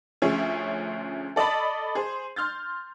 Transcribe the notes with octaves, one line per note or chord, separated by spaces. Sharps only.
D2 F3 C#4 G#4 C#5 E5
A4 D5 D#5 A5 B5
G#4 C5
C6 F6 G6 A6